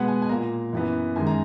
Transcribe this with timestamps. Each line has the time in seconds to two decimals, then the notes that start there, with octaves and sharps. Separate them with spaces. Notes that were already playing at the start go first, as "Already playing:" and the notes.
Already playing: B2 G#3 B3 F#5
0.08 G#5
0.22 G#5
0.29 A#2 A#3 A#5
0.73 F#2 E3 B3
1.16 F#2 D#3 G#3 G#5
1.27 A#5